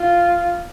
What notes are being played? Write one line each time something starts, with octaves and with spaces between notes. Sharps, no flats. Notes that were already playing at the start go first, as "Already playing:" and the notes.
Already playing: F4